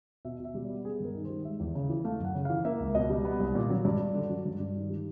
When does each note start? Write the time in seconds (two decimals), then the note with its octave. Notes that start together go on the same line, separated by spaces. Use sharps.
0.25 B2 E5
0.40 B2 E5
0.54 G3
0.65 D5
0.70 B3
0.85 B3 G#4
1.00 G2 A#4
1.15 D#3
1.25 G3 C5
1.45 G#3 E5
1.60 E2
1.75 C#3
1.90 E3
2.05 A3 F5
2.20 F#2 F#5
2.35 C#3
2.45 E3 F5
2.65 A#3 E5
2.80 C#2
2.95 B2 D#5
3.10 G3
3.25 B3
3.40 C2
3.55 A#2
3.70 F#3
3.85 G2 D5
4.00 G2
4.15 D3
4.29 F#3
4.45 G2
4.60 G2
4.75 D#3
4.90 G3